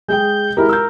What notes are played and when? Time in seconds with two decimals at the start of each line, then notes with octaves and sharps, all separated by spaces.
0.08 G#3 G#4 G5 G6
0.57 G#3 E4 G4 A#4
0.69 E6 G6